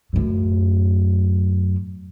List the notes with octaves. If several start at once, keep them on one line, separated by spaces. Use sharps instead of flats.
F#2 A2